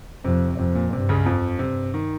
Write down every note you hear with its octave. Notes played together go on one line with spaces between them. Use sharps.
F2 C3
F2 C3
A#2
G2 C3
C#2 C#3
F2 F3
G2 C3
D#3